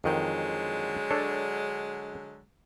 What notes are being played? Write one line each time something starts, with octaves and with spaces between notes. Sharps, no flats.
F2 D3 D#3 F#3 G#3 G5
D4 A4 C#5